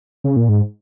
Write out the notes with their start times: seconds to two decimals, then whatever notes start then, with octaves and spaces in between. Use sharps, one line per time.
0.24 C#3
0.36 A#2
0.49 G#2